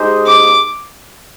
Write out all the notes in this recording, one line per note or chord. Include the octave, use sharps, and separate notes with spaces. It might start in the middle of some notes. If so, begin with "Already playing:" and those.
Already playing: G#3 D#4 G4 C5
D6